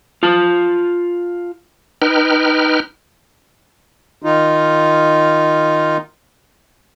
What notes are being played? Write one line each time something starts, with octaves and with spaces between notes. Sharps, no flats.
F4 A5
D#4 B4 G5 F6
D#3 D#4 F4